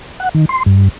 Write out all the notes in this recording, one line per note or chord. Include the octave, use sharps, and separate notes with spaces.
F#5
D#3
C6
G2